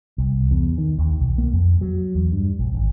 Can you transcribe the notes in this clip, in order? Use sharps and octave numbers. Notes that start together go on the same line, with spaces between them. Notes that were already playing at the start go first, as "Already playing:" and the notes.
C2
E2
D#3
D#2
B1
A#3
F2
F#3
E2
G2
A#1
G#1